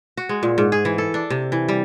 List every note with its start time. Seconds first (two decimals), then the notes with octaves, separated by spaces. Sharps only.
0.17 F#4
0.29 G#3
0.43 A#2
0.58 G#2
0.72 G#4
0.85 E3
0.98 A4
1.14 D4
1.30 C3
1.52 E3
1.69 G3